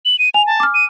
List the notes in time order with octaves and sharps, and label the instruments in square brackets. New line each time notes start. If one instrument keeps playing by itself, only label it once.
[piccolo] F#7
D#7
[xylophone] G#5 [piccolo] F7
[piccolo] A5
[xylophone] D6 F6
[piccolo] D#7